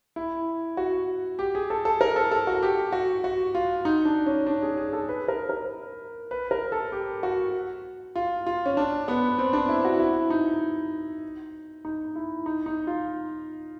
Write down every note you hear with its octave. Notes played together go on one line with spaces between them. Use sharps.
E4
F#4
G4
G#4
A4
A4
A#4
A4
A4
F#4
G4
F#4
F#4
F4
D#4
D4
C#4
D4
G#4
G#4
A4
B4
A#4
A#4
B4
A#4
A4
G4
F#4
F4
F4
C#4
D4
B3
C4
D4
E4
F#4
E4
D#4
D#4
E4
D#4
D#4
F4